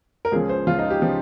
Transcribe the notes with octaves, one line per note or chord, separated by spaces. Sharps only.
A#4
C#2 C#3 F3 G#4
C5
C#2 C#3 F3 F4
D#4
G4
C#3 F3